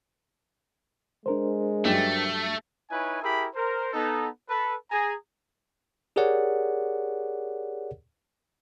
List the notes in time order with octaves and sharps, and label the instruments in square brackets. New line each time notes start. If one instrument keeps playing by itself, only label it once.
[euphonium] G#3 [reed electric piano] D4 A#4 C5
[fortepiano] G2 F#3 [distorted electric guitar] A3
[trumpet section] D#4 E4 B4 C#5 G#5
E4 G4 G#4 A#4 E5 B5
A#4 C5
B3 D#4 A4
A4 B4
G#4 G#5 A#5
[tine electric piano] G4 G#4 A#4 C#5 D5 F#5